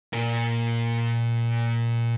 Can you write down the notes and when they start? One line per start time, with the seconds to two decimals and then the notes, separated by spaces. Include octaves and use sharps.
0.13 A#2 A#4